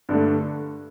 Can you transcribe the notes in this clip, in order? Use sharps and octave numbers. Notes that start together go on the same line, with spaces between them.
G2 D3 A3